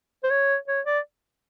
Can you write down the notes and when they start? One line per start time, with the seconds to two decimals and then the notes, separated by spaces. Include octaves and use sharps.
0.24 C5
0.30 C#5
0.68 C#5
0.86 D5